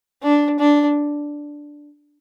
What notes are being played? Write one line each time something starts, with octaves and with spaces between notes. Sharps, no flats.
D4
D4